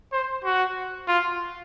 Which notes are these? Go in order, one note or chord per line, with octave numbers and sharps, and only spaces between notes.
C5
F#4
F4